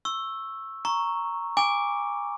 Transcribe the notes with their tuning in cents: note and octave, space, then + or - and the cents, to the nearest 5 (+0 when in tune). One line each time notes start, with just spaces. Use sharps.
C#6 -20 E6 +0
A#5 +0 C#6 +0
G#5 -35 D6 +0